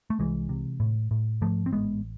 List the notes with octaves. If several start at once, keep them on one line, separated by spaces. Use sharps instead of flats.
A3
C2 E3 G#3
C3
A2
A2
G#2 F3 A3
C4
A1 G#3 B3